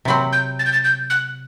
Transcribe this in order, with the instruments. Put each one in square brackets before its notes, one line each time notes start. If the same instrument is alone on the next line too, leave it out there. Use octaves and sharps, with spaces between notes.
[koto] C3 F#3 C4 [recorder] B5
[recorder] G6
A6
G6
A6
G6
F#6